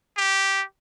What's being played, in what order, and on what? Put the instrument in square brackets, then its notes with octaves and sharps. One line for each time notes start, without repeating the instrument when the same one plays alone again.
[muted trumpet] G4